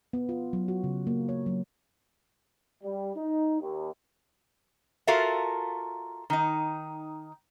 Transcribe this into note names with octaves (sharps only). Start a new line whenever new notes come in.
B3
F4
F#3
F#4
C#3
A#3
C#5
F#3
G3
D#4
D#2
F4 F#4 A4 A#4 E5 F5
D#3 D#4